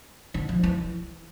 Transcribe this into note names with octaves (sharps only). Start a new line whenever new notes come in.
D3
F3
E3